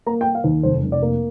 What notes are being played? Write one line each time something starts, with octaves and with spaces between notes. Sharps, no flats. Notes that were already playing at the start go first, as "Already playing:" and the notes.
A#3 A#5
G5
A#3
F5
D#2
F1 C5
F1
D5
A#3